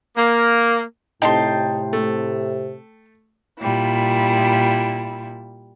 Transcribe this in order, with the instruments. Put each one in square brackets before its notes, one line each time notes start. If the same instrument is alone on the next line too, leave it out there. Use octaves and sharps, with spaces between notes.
[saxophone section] A#3
[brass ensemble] A2 C3 [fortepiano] D#4 [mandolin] G5 A5 C6
[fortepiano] A3
[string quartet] A#2 G3 E4